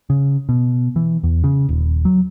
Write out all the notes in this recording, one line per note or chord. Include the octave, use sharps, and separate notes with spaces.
C#3
B2
E3
E2
C#3
D#1
F#3